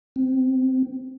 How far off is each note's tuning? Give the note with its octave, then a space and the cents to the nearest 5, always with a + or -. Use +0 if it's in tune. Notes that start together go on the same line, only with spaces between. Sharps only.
C4 -10